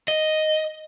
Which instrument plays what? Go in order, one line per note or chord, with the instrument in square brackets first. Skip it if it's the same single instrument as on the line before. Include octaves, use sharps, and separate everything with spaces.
[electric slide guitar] D#5